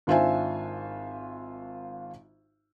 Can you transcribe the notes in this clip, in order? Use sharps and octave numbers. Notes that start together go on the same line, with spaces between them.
G#1 D4 F4 C5 E5 G#5